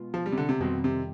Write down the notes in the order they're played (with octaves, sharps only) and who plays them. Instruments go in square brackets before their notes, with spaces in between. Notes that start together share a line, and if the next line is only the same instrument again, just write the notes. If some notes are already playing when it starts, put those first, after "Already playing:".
Already playing: [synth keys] B2 G#3 B3 F4
[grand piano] F3
G3
C3
D3
C3
[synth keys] F2 D#3 G3 C4 [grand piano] B2
[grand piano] C3